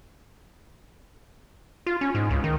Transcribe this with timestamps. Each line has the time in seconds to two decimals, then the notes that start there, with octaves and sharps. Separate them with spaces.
1.87 F4
2.01 C#4
2.15 G#2
2.30 C#2
2.44 D#3